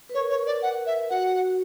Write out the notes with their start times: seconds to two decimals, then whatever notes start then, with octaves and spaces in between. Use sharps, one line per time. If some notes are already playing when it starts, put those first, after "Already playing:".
0.09 B4
0.14 A#4 C#5
0.30 C#5
0.46 D5
0.62 F#5
0.86 E5
1.10 F#4 F#5